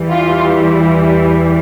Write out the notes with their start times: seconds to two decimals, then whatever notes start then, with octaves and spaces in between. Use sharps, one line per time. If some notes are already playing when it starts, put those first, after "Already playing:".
Already playing: E2 E3 G3
0.11 F4